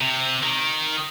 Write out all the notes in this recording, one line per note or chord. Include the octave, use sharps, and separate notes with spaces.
C3
D#3